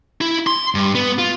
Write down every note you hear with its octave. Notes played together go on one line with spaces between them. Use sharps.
E4
C6
G2
B3
F4